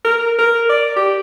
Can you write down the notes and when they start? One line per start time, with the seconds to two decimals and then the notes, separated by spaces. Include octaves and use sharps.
0.05 A#4
0.39 A#4
0.69 D5
0.96 G4